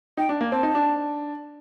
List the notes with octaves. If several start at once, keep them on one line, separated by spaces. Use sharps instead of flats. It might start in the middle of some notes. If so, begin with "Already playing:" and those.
D#4 G5
D4
A#3
C4 A5
D#4
D4